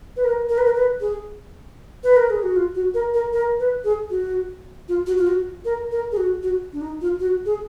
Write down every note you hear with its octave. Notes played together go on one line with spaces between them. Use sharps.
B4
A#4
A#4
B4
A#4
B4
G#4
B4
A#4
G#4
F#4
F4
F#4
A#4
A#4
A#4
B4
G#4
F#4
F4
F#4
F4
F#4
A#4
A#4
G#4
F#4
F#4
D4
D#4
F4
F#4
G#4